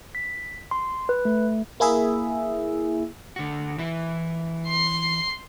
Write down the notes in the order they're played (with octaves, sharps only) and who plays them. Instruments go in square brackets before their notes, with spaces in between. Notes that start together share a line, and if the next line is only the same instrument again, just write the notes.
[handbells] B6
C6
B4
A3
[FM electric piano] A#3 E4 G#4 E5
[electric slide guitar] D3 F#4
E3 E4
[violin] C6 C7